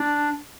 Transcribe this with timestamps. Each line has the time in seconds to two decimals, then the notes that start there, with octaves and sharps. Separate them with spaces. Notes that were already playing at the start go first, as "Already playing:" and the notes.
Already playing: D4